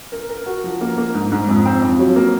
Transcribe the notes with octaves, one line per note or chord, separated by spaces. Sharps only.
A#4
A#4
F#4
F3
A#3
A#3
G#2
G#2
F2
C4
F2
F#3
A#3